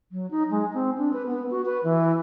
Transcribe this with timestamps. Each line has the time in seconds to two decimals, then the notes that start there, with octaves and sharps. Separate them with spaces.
0.12 F#3
0.31 D#4
0.50 G#3
0.74 C4
0.98 D4
1.13 B4
1.27 B3
1.51 F#4
1.65 B4
1.84 E3